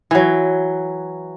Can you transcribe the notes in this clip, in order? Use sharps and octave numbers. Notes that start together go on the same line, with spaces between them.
E3 F#3